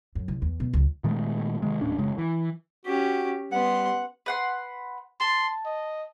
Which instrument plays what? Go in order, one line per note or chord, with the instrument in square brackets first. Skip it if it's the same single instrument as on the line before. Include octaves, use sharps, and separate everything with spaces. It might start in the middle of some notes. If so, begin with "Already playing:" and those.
[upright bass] F#2
C2
E2
B2
C#2 F#2
[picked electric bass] A#2 D#3 G#3 A3
C3 D#3 G#3
D#1 A2 C#4 D4
F#1 C#3 G#3
E3
[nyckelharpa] C#4 G4 [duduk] F#4
[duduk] G3 [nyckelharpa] B3 C6 [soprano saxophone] F#5
[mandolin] B4 F#5 C6
[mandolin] A5 [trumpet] C6
[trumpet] D#5